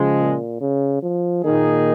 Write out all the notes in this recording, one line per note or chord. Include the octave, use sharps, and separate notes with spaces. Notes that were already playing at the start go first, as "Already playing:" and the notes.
Already playing: C#3 F3 G#3
A#2
C#3
F3
A#2 D#3 A#3 D#4 G#4